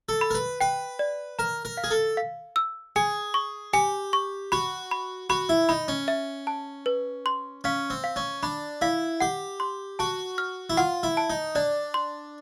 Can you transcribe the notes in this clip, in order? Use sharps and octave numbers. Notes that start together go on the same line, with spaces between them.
A4
B5
A#4
B4
B4 G5
D5
A#4 A#5
A#4
F5
G#4
A4
F5
E6
G#4 G#5
C#6
G4 G#5
C#6
F#4 B5
B5
F#4 B5
E4
D#4 B5
C#4
E5
A5
B4
C6
C#4 F5
C4
F5
C#4
D4 B5
E4 F5
G4 F#5
C6
F#4 A5
F6
E4
F4 F#5
E4
A5
D#4
D4 D5
C6